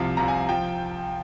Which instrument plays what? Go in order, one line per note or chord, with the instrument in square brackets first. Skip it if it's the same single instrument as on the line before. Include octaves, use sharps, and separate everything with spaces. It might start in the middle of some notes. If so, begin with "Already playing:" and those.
Already playing: [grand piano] C2 C3 F3 F5
C2 C3 F3 A#5
G#5
F3 G5